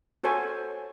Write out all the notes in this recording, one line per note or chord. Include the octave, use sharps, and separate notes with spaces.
F#4 A4 C5 C#5 G#5